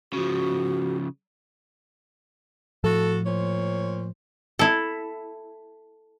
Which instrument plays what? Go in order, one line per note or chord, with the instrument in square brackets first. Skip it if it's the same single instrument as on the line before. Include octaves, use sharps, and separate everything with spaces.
[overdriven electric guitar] C#3 F3 [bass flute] F#4
[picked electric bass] A2 F3 [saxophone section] F#4 A4
[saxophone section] A#2 C5 C#5
[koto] E4 A4